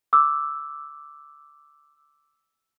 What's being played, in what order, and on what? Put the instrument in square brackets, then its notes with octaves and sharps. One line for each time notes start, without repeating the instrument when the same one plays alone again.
[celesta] D6 E6